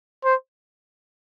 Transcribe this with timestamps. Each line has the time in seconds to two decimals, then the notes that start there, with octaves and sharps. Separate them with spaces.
0.25 C5